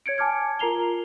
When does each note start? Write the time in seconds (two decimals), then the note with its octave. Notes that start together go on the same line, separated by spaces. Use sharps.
0.06 C#5 G#6 C#7 D7
0.18 G#5 A5 D6 F6 G#6
0.59 F4 A#4 A#5 C7 F7 G7